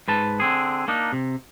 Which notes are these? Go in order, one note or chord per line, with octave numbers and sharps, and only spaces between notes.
G#2 B4 A5
D3 C4 G#4
A#3 D4 D#4
C3